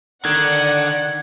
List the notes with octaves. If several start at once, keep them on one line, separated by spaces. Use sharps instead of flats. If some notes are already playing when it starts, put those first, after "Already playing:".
D3 D#3 D5 F#5 G#6